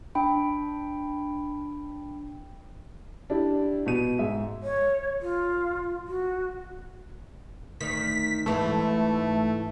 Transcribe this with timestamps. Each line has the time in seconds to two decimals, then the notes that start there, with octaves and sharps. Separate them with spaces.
0.15 D4 G5 B5
3.30 D4 E4 G4
3.86 B2 D#7
4.19 G#2 G#4 E5
4.63 C#5
5.22 F4
6.08 F#4
7.80 D2 D#3 B6
8.46 G#2 E3 A3